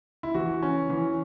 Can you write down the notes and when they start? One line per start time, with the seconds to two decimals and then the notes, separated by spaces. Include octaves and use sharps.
0.23 E4
0.34 E3 F#4
0.63 C#4
0.90 E3